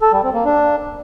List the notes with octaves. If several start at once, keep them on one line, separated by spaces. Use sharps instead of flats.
A4
G3
C4
A#3
D4